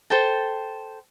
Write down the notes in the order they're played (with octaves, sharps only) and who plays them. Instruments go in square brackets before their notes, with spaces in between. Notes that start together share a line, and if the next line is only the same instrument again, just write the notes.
[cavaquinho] A4 C5 G5 A5